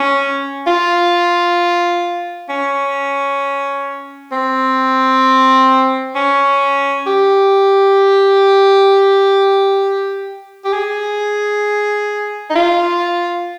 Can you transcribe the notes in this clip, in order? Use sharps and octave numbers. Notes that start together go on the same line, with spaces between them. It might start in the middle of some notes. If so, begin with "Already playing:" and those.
Already playing: C#4
F4
C#4
C4
C#4
G4
G4
G#4
D#4
F4